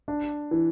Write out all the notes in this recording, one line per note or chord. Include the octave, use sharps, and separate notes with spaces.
D4
E3